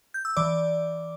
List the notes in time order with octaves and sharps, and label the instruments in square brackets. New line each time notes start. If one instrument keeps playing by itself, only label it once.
[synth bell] G6
E6
E3 D5 D6